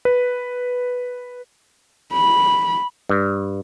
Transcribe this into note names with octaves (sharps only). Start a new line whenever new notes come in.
B4
B5
G2